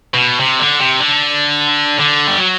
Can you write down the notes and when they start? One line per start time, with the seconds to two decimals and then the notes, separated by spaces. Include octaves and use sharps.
0.14 B2
0.40 C3
0.59 D3
0.80 C3
1.00 D3
1.99 D3
2.27 G3
2.39 F#3